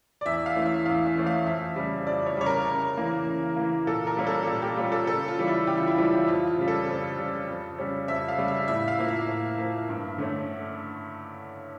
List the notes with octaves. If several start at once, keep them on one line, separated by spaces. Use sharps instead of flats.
D5
E2 E5
F5
E3 A3 C#4
E5
E2 F5
E5
E3 A3 C#4
F5
F2 E5
C#3 G3
F2 D5
C#5
C#3 G3 C#5
A#4
C#3
E3 A#3
C#3
E3 A#3
A#2 A4
A#4
G3 A#3 C#4
A4
A#2 A4
G4
G3 A#3 C#4 F4
A4
C#3 A4
F4
E3 G3 C#4
E4
C#3 G4
F4
E4
E3 G3 C#4 F4
F2 F4
F4
C#3 G3
A4
F2
C#3 G3
F2
C#3 G3 C#4
F2 E5
F5
C#3 G3 C#4
E5
A2 E5
F5
F3 A#3
E5
A2
F3 A#3
G2
D3 A3 C#4